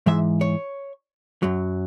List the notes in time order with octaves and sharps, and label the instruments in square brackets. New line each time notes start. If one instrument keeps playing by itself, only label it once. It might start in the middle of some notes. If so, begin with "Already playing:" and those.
[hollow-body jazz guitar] G#2 E3 G#3 E5
C#5
F#2 F#3